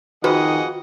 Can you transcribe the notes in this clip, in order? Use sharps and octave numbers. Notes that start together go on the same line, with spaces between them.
F2 D#3 F4 F#4 G#4 B4 D#5 F#5